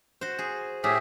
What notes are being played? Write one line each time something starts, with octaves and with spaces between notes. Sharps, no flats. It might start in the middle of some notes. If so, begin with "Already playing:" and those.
F#4 C5
G#4
A2 G4 G#4 E5